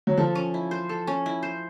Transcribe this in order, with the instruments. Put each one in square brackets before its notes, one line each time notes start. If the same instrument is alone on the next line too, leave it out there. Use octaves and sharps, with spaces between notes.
[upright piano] F#3
[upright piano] F3 [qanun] A4
[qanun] C#4
E4
C5
A4
C#4
E4
C5